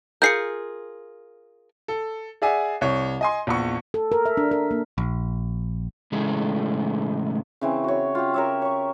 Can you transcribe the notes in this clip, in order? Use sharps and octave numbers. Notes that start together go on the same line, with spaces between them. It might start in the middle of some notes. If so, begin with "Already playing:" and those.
F4 G#4 A#4 G6 C7 C#7
A4
G#4 D5 E5 F#5 G#5
C2 C#5
D#5 G#5 C6
A#1 E2 C#6
A4
A#4
E5
D4
A#4
A#3
A#1
A2 C#3 E3 G#3 A3
C#3 E3 C4
F#4 C#5
F4 G4
A#4 C#5 E5
C#5 C#6